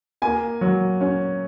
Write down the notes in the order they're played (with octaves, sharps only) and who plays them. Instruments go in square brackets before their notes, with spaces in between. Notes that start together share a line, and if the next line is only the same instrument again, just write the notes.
[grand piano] A#3 G#5
F#3
C#4